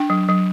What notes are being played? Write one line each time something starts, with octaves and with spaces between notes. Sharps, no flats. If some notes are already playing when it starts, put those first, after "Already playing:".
Already playing: D4 G5
F#3
F#3